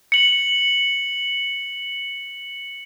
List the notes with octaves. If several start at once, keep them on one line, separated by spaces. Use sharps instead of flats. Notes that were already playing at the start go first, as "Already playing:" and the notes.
C#7 F#7